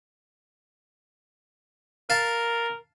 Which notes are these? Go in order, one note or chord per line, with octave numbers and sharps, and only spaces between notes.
A#4 F5 A5